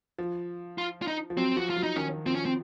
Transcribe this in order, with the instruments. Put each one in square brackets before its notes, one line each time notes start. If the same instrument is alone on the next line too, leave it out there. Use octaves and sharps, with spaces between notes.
[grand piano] F3
[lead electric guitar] F4
F4
D#4
[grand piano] F3
[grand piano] F#3 [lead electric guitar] C4
[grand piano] F3 [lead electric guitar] F#4
[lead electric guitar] F4
[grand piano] F#3
[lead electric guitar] D#4
[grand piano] D#3 [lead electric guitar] C#4
[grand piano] F3 [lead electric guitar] C4
[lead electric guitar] C#4
C4